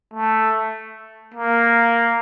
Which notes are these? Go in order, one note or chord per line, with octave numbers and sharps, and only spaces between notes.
A3
A#3